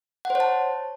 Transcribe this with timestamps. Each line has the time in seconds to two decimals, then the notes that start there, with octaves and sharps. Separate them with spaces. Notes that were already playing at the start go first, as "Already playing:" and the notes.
0.25 F#5
0.30 C5
0.35 C#5
0.40 A5